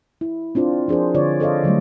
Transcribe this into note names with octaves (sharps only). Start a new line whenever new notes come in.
E4
C4 D4 F4 C5 D5
F3 D4 G#4 A#4 C5
D3 F4 C#5 D5
A4 C5 D5 D#5 F5
D3 F#3 G3 A3